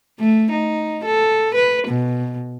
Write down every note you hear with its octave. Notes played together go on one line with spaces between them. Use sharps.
A3
D#4
A4
B4
B2